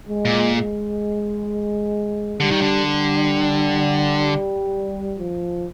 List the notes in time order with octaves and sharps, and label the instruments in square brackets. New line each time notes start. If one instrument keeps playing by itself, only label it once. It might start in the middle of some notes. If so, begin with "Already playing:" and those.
[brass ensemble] G#3
[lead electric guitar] A#2
[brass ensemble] G#3
[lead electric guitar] D3 [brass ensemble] G3
[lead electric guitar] D#3
D3
[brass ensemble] G3
F3